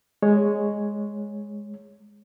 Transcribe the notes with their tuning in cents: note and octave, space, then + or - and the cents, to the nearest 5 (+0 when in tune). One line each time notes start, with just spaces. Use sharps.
G#3 +0 C#5 +0